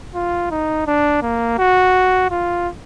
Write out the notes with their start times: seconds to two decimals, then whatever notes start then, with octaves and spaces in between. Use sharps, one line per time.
0.15 F4
0.51 D#4
0.87 D4
1.23 A#3
1.58 F#4
2.31 F4